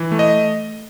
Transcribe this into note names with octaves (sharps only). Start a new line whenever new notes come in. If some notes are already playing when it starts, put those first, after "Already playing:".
Already playing: E3
A3
D#5